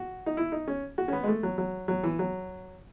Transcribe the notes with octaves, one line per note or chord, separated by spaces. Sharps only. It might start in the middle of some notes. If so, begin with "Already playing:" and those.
Already playing: F#4
D#4
E4
D#4
C#4
F#4
C#4
B3
G#3
A3
F#3
F#3
F#3
E3
F#3